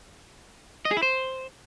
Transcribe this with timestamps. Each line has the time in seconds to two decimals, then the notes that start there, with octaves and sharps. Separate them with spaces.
0.85 D#5
0.91 G#4
0.97 E4
1.03 C5